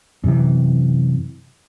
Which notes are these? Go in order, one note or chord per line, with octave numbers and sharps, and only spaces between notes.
F#2 C3 E3